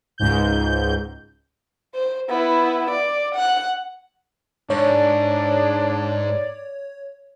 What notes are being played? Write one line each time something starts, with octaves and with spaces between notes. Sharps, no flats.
C#2 G#2 G6
C5
B3 E4
D5
F#5 F#6
G#2 D4 C#5 D5